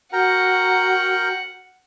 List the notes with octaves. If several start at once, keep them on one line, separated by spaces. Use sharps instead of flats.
F#4 A#4 F#5 G5 A#5